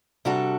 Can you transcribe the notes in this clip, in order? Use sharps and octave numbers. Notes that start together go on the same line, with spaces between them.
C3 G3 D4 F#4 A4